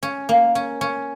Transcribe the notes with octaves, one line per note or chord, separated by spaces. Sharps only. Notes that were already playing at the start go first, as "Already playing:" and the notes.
C#4
A#3
C#4
C#4